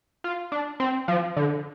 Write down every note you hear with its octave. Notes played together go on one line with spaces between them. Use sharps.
F4
D4
C4
F3
D3